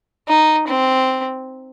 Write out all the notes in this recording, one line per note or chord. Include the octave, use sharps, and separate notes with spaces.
D#4
C4